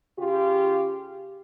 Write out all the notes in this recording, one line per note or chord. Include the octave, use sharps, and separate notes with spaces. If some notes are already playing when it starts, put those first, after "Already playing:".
C#3 F4 G4